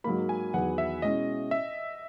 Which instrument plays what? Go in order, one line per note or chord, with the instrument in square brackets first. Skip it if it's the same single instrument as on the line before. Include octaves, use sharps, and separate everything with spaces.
[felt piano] G#2 F#3 A#3 [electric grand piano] B5
[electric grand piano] G#5
[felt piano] E2 D#3 F#3 B3 [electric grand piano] F#5
[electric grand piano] E5
[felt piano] B2 G#3 C#4 E4 [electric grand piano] D#5
[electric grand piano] E5